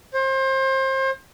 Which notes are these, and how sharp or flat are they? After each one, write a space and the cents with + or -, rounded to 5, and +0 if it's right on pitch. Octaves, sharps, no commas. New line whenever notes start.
C5 +30